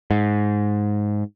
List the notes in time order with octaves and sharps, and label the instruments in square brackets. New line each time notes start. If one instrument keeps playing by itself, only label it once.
[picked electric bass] G#2